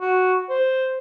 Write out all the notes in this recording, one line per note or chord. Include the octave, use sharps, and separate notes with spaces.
F#4
C5